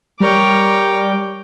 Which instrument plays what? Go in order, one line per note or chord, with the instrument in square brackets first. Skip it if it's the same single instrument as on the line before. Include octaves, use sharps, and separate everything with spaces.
[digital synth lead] G3 [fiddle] A#4 C#5 [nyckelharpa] G5 D6